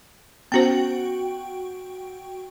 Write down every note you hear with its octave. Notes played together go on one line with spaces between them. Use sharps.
B3 C#4 F#4 C5 G5